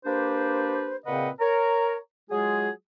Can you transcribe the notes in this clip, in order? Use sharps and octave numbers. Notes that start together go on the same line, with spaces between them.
A#3 D4 G4 B4 C5
A#2 C#3 C4 B4 D#5 F#5
A#4 C#5 A#5
F#3 G#3 F4 G#4